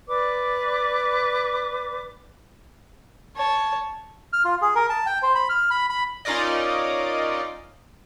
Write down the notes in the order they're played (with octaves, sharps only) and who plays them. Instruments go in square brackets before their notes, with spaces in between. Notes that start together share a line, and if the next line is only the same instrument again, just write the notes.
[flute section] B4 D5 D6
[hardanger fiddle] C#5 A5
[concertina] F6
F4
G#4
A#4
A5
G5
C5
B5
F6
B5
B5
[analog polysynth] C#4 D#4 F4 A#4 D5 D#5